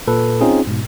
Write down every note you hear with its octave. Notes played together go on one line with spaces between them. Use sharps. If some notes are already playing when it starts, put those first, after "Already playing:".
A#2 A4 B4
C4 C#4 D#4 F4 G#4
G#2 B2